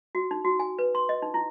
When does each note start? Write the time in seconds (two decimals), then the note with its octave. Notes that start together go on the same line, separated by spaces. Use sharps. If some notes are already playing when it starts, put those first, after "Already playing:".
0.15 F#4
0.31 D#4
0.45 F#4
0.60 G#5
0.79 B4
0.95 C6
1.09 D#5
1.22 D#4
1.34 E4